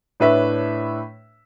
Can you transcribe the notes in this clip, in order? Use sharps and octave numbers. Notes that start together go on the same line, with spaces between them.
A2 D4 B4 C#5 E5 B6